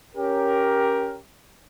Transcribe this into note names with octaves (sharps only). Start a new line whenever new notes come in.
C#4 G4 A#4